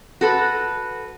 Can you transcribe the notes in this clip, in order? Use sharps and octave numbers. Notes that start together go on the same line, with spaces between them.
F#4 A4 B4